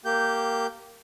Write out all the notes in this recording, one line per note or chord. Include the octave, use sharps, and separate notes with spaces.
A#3 G4 G6